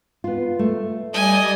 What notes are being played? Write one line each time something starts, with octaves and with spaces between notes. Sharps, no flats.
B3 F4
A3
G3 D5 D#5 G#5